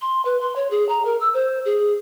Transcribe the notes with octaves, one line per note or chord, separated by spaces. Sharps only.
C6
B4
C6
C#5
G#4
A#5
A#4
E6
C5
G#4